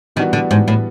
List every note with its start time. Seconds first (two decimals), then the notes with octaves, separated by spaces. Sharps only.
0.16 D#3 E3 G3 B3 D4 F#4
0.33 D3
0.51 G#2
0.68 A2